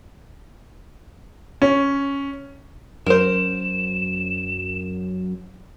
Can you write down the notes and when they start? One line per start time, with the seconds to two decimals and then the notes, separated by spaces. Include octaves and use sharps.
1.62 C#4
3.06 F#2 A#4 C5 E7